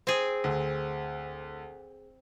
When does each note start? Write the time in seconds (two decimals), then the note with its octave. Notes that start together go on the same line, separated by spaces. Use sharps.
0.07 C4 G#4
0.44 D2